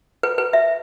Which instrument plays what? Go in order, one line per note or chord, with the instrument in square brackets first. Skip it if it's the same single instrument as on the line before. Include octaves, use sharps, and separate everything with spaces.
[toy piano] B4
B4
E5